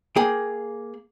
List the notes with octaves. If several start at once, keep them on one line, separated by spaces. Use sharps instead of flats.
A#3 G#4 G5